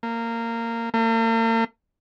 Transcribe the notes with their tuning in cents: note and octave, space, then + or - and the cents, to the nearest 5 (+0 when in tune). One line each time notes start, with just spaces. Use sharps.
A#3 -20
A#3 -45